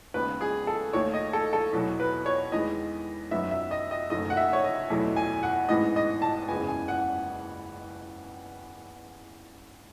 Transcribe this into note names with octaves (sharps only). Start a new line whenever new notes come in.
D#2 C#3 G#3 B3 B4
G#4
A4
D#2 D#3 A3 C#5
D#5
A4
A4
E2 B2 F#3
B4
C#5
E2 D#3 G#3 B3 D#5
F#2 D#3 F#3 B3 E5
E5
D#5
D#5
F#1 F#2 D#3 A3 D#5
F#5
E5
C#5
D#5
E2 B2 F#3 A3
G#5
F#5
A1 G#2 E3 B3 D#5
D#5
A5
F#1 E2 C#3 G#3 B3 G#5
G#5
F#5